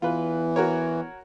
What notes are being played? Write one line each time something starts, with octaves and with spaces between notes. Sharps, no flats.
E2 E3 F4 B4
F#4 A#4 C#5